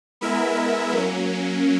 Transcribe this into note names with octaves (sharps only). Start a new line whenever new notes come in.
G#3 B3 E4 A#4 E5
F#3 A#3 C#4